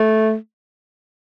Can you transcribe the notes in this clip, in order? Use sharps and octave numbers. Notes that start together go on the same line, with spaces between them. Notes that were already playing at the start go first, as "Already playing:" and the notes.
Already playing: A3